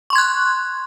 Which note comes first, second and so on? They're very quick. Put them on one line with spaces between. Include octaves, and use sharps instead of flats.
C#6 C6 G#6 F#6